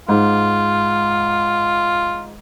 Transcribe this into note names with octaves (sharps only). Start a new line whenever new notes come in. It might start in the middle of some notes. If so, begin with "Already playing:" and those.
G#2 F4